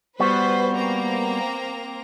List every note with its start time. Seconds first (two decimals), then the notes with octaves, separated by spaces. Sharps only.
0.20 G3 B3 F#4 B4 C5
0.72 A#3 C4 A#5